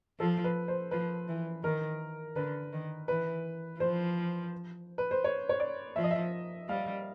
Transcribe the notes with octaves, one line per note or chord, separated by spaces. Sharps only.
F3 A4
B4
C5
F3 B4
E3
D#3 A#4
D3 B4
D#3
E3 B4
F3 C5
B4
C5
C#5
C#5
D5
F3 E5
D#5
E5
G3 F5